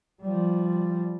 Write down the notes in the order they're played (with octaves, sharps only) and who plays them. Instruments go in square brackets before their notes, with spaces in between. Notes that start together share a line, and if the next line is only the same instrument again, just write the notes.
[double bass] F3 G3